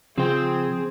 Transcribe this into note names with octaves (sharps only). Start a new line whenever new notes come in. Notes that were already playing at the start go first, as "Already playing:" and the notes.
C#3 F3 C4 G#4 C5